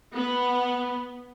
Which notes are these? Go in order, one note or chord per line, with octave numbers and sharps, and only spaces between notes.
B3